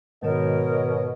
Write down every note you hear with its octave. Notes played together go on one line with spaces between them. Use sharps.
G#2 B2 D#3 A#4 C#5 D#5